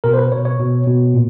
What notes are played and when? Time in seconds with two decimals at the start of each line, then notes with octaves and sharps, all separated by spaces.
0.04 B2 A#4
0.13 C5
0.18 B4
0.32 B2 C#5
0.45 C#5
0.59 B2
0.87 B2
1.14 A#2